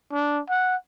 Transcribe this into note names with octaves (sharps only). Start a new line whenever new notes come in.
D4
F#5